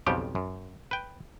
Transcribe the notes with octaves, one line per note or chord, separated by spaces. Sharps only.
B1 F2 C#3 F3 G3 G4
F#2
B4 G5